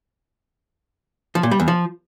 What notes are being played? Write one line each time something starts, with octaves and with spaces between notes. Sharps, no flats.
F3
A#2
G3
E2
F3